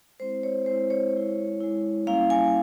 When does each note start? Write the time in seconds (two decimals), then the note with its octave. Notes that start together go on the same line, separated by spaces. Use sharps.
0.20 G#3 C4 E4 C5
0.43 C#5
0.66 G#3 C4 E4 C5
0.90 C#5
1.13 G#3 E4
1.61 G#3 E4
2.07 G3 A#3 C#4 E4 F5
2.30 G#5